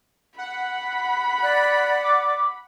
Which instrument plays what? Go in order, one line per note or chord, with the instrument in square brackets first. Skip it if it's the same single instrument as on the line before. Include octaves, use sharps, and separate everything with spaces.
[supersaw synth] F#5 [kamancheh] B5
[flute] D5 [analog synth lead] F#6
[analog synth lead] D6